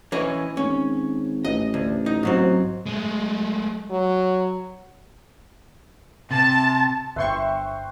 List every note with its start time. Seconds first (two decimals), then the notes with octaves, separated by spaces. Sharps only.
0.12 E3 C#4 D#5
0.57 G#1 C#4
1.45 A1 D#5
1.74 D2
2.06 D#4
2.23 G#2 F#3 C4
2.86 G#3 A3
3.90 F#3
6.31 C3 A5
7.16 G1 B4 C5 E5 G5 C6 C#6